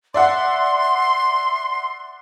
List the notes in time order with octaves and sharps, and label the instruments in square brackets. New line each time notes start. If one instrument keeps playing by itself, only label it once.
[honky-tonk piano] D5 E5 F#5 [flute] C6